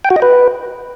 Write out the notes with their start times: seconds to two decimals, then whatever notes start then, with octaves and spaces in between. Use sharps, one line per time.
0.05 G5
0.10 F#4
0.16 D#5
0.22 B4